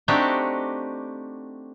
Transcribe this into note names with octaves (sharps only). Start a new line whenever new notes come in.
A3 C4 D4 D#4 F#4 G4